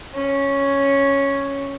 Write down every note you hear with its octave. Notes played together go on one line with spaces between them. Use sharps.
C#4